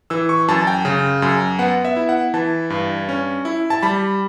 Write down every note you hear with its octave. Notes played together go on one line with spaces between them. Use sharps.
E3 E6
C#6
F#2 A5
G5
C#3
F#2
B3 F#5
E5
E4
F#5
E3 A5
G2
C#4
E4
A5
G3 B5